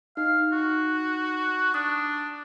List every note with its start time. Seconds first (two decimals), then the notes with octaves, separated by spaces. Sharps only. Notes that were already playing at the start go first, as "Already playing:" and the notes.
0.17 D#4 F5
0.52 F#4
1.74 D4 D#6